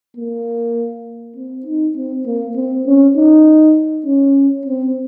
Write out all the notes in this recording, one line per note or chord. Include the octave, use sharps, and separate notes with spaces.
A#3
C4
D#4
C4
A#3
C4
C#4
D#4
C#4
C4